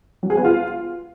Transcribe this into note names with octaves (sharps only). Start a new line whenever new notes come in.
F#3
G#4
B3
F4